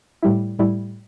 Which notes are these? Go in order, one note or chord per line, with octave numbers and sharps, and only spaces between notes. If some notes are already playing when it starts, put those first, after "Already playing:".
A2 G3 E4
A2 G3 E4